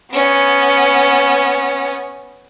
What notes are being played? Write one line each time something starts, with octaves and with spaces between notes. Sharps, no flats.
B3 C#4